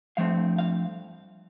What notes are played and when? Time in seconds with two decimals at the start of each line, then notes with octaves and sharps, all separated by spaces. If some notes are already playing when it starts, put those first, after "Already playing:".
0.17 G2 F3 A3 C4 F5
0.58 F5